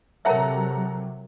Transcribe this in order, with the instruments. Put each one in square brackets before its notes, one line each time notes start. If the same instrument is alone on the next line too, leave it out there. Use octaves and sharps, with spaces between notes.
[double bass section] C3 F#3 [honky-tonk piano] A4 F#5 A#5 [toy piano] A#4 C#5 E5